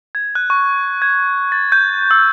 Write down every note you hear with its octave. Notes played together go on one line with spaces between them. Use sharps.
G#6
F#6
C#6
G#6
A6
G6
E6